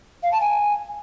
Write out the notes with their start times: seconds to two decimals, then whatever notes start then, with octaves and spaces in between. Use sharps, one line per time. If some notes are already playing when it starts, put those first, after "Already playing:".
0.23 F5
0.32 A5
0.41 G#5